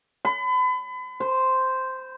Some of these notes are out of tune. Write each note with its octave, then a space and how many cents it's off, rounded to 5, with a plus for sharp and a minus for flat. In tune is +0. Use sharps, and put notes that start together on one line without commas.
B5 +35
C5 -5